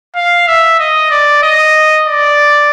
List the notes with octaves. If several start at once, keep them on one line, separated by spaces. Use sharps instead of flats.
F5
E5
D#5
D5
D#5
D5